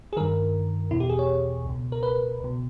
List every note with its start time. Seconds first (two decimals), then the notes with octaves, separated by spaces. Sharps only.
0.13 G#4
0.17 G2 D#3 A#4
0.91 E2 B2 E4
1.00 G4
1.09 G#4
1.19 C#5
1.65 C#2 B2
1.92 A#4
2.03 B4
2.40 C#2 B2